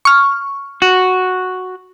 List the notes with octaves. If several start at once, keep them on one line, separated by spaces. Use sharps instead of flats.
C#6 F6
F#4